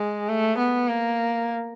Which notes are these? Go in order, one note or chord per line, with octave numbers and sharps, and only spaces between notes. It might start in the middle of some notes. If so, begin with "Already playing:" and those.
Already playing: G#3
A3
B3
A#3